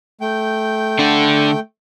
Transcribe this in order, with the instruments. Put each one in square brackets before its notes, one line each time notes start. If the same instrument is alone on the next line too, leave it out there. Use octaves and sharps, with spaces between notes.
[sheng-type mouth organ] A3 G5 G6
[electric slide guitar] D3 D4